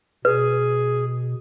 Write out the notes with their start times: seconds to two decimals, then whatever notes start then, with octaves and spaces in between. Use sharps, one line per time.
0.25 B2 G#4 B4